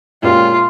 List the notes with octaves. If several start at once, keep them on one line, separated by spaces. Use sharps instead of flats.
A#2 G#3 C#4 F4 G4 A#4